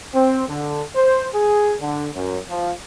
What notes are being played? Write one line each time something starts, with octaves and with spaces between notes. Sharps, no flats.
C4
D3
C5
G#4
D3
F#2
F3